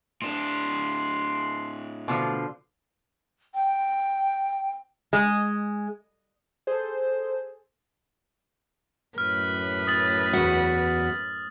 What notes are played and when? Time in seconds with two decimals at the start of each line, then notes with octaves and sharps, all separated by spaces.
0.22 A2 D4 C6
2.08 B2 D3 F3 C6
3.54 G5
5.13 G#3
6.67 G#4 A4 C5
9.18 F#2 A2 B4 F6
9.87 D#6 A6 F#7
10.33 E2 F#4